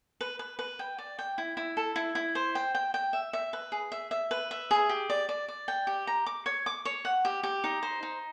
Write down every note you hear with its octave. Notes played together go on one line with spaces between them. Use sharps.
B4
B4
B4
G5
D5
G5
E4
E4
A4
E4
E4
C5
G5
G5
G5
E5
E5
B4
G#4
E5
E5
B4
E5
G#4
G4
D5
D5
D5
G5
G4
A#5
D6
C#5
D6
C#5
F#5
G4
G4
D#4
C5
D#4